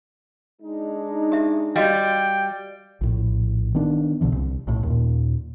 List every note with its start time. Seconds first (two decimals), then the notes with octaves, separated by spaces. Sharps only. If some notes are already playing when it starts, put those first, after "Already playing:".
0.61 G#3 D4 D#4
1.32 G4 E5
1.76 G3 F#4 D#5 F5 G5
3.01 A#1 A2
3.75 D#3 B3 D4
4.21 C2 B2 D3 E3
4.32 C2
4.67 B1 A2
4.83 D#2 A#2